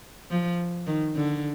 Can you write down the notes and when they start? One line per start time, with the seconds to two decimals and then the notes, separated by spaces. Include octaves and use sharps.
0.30 F3
0.87 D#3
1.16 D3